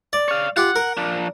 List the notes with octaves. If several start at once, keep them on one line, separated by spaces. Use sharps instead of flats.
D5
C#5 F5
F4 G4 F#5
A#4
F3 D4